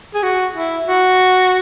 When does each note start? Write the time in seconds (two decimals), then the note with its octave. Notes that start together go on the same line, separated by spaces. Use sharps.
0.14 G#4
0.23 F#4
0.55 E4
0.88 F#4